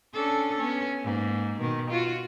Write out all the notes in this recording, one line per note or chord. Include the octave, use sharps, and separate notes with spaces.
C#4 D4 A4
B3 C#4
G#2 A#3
B2 D#3
F4 F#4